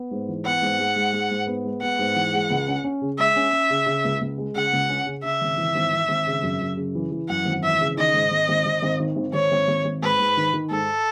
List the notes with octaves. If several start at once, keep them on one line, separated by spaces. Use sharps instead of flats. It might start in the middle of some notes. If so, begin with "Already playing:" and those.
Already playing: B3
G#2
E3
B3 F#5
G#2
G#3
G#2
G#3
G#2
B3
G#3
B3 F#5
G#2
E3
G#3
C#2
C#4
C#4
C#3
G#3 E5
C#4
C#4
C#3
C#3
C#2
C#2
G#3
C#3 F#5
C#2
C#4
C#3
C#3 E5
G#1
E3
G#1
G#1
G#1
C#3
F#2
F#2
C#3
E3
E3
F#2 F#5
G#1
E3 E5
C#3
D#3 D#5
G#2
G#1
G#1
G#1
G#1
D#3
G#1
G#1 C#5
G#1
G#1
G#1
G#2 B4
G#2
D#3
D#3
G#2 A4